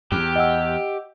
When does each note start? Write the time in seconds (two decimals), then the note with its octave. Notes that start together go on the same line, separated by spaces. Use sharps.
0.12 E2 G4
0.36 D#5 F#5 E6